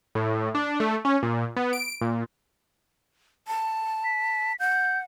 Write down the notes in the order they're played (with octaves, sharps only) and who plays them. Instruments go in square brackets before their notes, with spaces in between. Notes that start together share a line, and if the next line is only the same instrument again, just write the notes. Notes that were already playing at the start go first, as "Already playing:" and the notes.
[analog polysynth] A2
D4
A3
C#4
A#2
B3
D7
A#2
[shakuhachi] A5
[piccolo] B6
[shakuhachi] F#5 [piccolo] G6